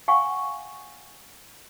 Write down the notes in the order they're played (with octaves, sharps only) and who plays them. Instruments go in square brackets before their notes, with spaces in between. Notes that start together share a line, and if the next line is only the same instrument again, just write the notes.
[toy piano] F5 F#5 G#5 C#6